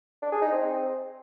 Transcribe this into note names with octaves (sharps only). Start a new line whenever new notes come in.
D4
G#4
D#4
C4